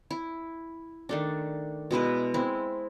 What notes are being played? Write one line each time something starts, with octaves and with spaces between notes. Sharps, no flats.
E4
D#3 A3 D4
B2 G#3 E4 B4
G#3 C4 E4